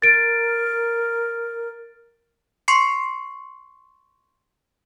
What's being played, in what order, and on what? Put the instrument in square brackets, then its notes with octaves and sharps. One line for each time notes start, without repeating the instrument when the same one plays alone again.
[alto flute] A#4 [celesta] A6 D7
[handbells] C6 C#6 C7 C#7